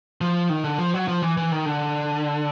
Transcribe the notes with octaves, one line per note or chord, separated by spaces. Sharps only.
F3
D#3
D3
F3
F#3
F3
E3
E3
D#3
D3